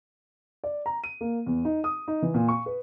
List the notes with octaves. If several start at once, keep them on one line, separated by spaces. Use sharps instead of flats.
D5
A#5
D#7
A#3
E2
D#4
D#6
D#4
E3
A#2
C#6
B4